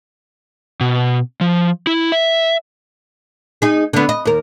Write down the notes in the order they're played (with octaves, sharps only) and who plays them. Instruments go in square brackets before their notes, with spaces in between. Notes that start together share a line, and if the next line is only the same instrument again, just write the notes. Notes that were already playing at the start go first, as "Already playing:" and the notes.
[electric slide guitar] B2
F3
E4
E5
[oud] D#4 G#4
D3 B3
D#5
D#2 A#4